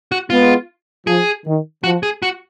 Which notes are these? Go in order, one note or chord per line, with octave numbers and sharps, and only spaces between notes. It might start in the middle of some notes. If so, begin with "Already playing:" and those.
F#4
G#3 B3 F4
F3 G#4
D#3
F3 F#4
G#4
F#4